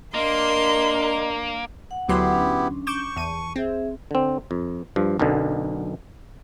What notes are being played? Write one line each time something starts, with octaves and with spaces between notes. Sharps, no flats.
A#3 D4 A#4 D#5 C6
F#5
D2 F#3 B3 E4 G4 C6
C#4 D4
C#6 D6 G6 E7
E2 A5 D#7
C4 G#4 E5
D3 C4
F2
G2 F3
B1 F#2 B2 D3